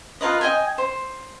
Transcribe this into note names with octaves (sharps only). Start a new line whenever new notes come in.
F4 A#4 B4 D#5
D#5 G5 G#5
C5